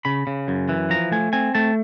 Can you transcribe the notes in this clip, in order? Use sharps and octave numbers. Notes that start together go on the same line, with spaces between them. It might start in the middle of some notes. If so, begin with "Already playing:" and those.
C#3 B5
C#3
F#2
E3
F3 A#5
A3 G#5
C4 G#5
A3 A5